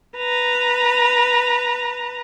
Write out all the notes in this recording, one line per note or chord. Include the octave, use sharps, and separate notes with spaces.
B4 A#5